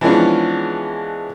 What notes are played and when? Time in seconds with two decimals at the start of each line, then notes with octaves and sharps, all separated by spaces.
0.01 E3 F3 G#3 B3 C#4 D4